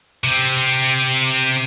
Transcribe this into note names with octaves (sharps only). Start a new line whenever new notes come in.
C3 C4